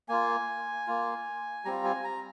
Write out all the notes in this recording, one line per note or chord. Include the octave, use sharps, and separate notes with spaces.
A#3 F4 G#5
A#3 F4
G3 C4 F4 A#5
G#5
A#5